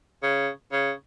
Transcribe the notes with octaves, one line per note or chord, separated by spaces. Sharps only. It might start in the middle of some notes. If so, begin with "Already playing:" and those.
C#3
C#3